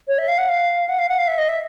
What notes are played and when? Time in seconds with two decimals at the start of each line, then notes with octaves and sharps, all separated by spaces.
0.08 C#5
0.18 E5
0.28 F5
0.38 F#5
0.49 F5
0.89 F#5
0.99 F5
1.09 F#5
1.18 F5
1.27 E5
1.38 D#5
1.49 E5